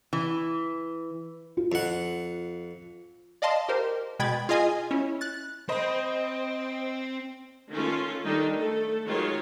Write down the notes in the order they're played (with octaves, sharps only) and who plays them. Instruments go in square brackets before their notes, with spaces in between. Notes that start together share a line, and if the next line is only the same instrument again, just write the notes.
[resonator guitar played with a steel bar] E3
[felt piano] F4
[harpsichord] F2 F#5
[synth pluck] D5 D#5 F5 A5 C6
G4 A#4 C5
B2 G#3 G5 B5 G#6 A6
F4 G#4 D#5 G#5
C#4 E4
F#6 A6
[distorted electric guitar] C4 [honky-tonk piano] C5 D#5 B5
[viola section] D#3 C#4 F4 A4
D#3 G3 D4 D#4 A4
A3 A4
D#3 F#3 G#3 F4 C#5